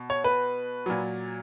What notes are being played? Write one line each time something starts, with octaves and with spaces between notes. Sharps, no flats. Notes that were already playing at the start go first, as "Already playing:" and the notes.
Already playing: B2
C#5
B4
A#2 F#3